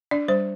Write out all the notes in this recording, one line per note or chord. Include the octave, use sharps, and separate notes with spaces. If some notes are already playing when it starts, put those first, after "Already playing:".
D4 D5
G3 C5